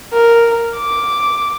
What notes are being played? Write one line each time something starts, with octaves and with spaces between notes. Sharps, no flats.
A#4
D6